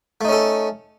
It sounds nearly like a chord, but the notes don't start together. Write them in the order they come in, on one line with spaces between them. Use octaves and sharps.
A3 D#4 C#4 A4